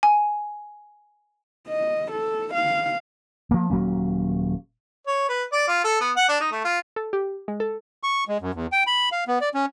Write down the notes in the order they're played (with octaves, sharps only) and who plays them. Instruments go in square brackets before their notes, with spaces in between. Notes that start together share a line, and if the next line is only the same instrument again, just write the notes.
[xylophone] G#5
[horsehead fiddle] D#5
A4
F5
[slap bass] F3 A#3
D#1 F#3 A#3 C#4
[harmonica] C#5
B4
D5
F4
A4
B3
F#5
D4
D#4
A3
F4
[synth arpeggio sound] A4
G4
G#3
A4
[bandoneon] C#6
G#3
F#2
E2
G5
B5
F5
B3
D5
C#4